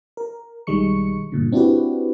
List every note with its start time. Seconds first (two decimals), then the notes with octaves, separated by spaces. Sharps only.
0.17 A#4
0.67 B1 D#3 G3 G#3 C#6 C#7
1.32 G2 A#2 D3
1.52 C4 D4 E4 F#4 G4 B4